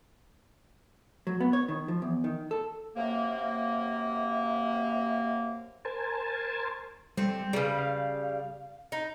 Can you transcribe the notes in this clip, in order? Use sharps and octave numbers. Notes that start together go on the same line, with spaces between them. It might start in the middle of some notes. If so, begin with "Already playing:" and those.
F#3
B3
C#5
D#3
F3
E2
D#3
A4
F#2 C3 A#3
A#4 C5 G#5 A5
G3 C4 A4
C#3 G3 G#4 B4
F5
D#4